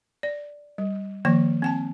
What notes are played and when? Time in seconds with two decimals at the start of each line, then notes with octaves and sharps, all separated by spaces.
0.23 D5
0.78 G3
1.25 D#3 F3 A#3 G5
1.62 C4 G5 A5